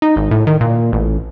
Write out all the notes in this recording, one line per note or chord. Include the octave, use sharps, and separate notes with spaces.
D#4
G#1
A2
D#3
A#2
A1